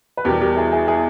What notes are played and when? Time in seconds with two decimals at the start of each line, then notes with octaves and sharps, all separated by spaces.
0.17 B4
0.25 E2 B2 G3 G4 A#4
0.41 G4 A#4
0.56 E4 G#4
0.72 E4 G#4
0.88 E4 G#4